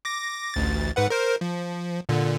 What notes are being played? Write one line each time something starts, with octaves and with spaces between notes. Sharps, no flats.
D6 A#6
A1 D2 A6
G#2 B4 F#5
A#4 C5
F3
A#2 D3